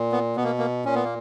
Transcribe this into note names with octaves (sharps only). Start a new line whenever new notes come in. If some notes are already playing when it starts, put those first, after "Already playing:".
Already playing: A#2
B3
B2 B3
A#3
A#3
A#2 C#4
B3
A#3